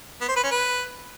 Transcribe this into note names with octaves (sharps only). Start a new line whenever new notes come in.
B3
C5
B4
C#4
B4